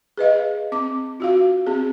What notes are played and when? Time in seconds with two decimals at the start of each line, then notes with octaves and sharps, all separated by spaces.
0.17 G#4 B4 D#5 F5
0.72 C4 D6
1.20 F4 F#4 F5
1.66 C4 G#4